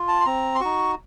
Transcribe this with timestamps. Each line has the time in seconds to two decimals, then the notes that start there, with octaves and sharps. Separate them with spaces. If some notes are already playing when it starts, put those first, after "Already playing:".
Already playing: F4
0.08 A5
0.21 C6
0.25 C4 A#5
0.55 C6
0.60 D#4 F#4 C#6